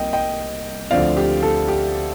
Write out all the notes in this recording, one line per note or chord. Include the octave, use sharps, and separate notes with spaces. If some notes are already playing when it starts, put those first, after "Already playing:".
Already playing: C2 C3 F3 A#3 D#5 G5
D#5 G5
D2 D3 F3 C4 D5 F5
G4
A4
G4